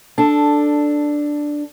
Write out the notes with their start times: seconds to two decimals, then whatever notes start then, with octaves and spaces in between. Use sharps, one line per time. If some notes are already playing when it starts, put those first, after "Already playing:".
0.18 D4 A4